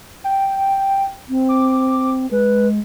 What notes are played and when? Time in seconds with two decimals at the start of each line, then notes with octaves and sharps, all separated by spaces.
0.24 G5
1.30 C4
1.49 D6
2.31 G#3 B4